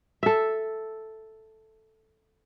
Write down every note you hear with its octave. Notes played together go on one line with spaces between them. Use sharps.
A4 E5